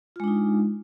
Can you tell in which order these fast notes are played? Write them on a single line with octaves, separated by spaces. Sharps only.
F4 G#3 D4 D#4